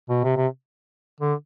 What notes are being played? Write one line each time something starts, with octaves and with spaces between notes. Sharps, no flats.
B2
C3
C3
D3